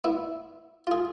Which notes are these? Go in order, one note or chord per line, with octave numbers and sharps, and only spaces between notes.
B3 E4
F4 G#4